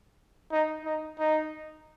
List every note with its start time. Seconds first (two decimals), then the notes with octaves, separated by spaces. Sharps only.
0.52 D#4
0.85 D#4
1.19 D#4